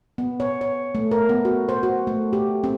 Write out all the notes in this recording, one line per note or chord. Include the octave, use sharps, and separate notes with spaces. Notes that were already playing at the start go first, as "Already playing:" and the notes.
B3
C#5
C#5
A3
A#4
B3
F#4
C5
F#4
A3
G4
C4